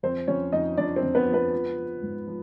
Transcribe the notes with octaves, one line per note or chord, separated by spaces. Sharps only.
F2 C4 C5
F2 C#4 C#5
F2 D#4 D#5
F2 D4 D5
C4 C5
F2
B3 B4
F3
B3 B4
F3
F3
G#2
F3